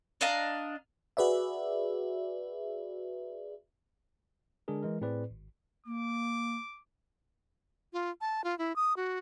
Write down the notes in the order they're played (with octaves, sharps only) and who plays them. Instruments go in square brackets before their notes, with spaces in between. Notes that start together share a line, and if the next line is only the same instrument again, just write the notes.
[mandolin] D4 D#5 F5 A#5
[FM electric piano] F#4 G#4 B4 D5 E5
[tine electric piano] D3 G#3 D4 G#4 A#4
E3 G#3 A#4
A2 C4 G#4 B4 D5
G#1
[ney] A#3 [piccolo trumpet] D6
[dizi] F4
A5
F4
E4
D#6
F#4